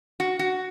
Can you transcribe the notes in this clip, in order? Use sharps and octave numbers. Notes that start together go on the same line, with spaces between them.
F#4
F#4